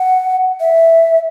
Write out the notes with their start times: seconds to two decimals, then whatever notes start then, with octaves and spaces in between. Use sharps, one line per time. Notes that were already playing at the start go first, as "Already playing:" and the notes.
Already playing: F#5
0.60 E5